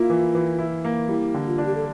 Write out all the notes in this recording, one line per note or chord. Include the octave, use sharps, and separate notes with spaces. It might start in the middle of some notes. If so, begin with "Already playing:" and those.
Already playing: A#3 E4 F4
E3
E3
E4
A#3
G3 E4
D3
F4
D4
G4
A4